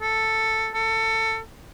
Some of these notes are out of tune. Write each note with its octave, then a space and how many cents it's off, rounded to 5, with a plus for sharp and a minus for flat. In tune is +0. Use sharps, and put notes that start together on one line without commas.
A4 +5
A4 +20